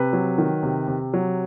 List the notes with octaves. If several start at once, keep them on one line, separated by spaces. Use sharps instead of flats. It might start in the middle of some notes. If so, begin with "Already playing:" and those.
Already playing: C3 B4
F#3
D#3
C3
C3
F#3